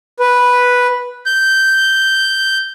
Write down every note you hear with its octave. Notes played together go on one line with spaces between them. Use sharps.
B4
G6